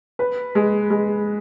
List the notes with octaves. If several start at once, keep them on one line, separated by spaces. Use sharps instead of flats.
B4
G#3
G#3